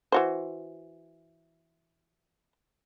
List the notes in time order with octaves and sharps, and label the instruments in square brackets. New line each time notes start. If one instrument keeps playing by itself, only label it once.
[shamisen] E3 F#4 C5